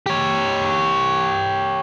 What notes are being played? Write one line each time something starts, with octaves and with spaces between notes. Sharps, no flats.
G4 C#5